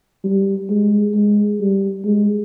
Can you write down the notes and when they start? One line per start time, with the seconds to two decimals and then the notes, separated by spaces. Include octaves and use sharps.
0.25 G3
0.70 G#3
1.15 G#3
1.61 G3
2.05 G#3